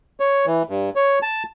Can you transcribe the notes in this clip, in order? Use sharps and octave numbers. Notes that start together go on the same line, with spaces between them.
C#5
E3
G2
C#5
A5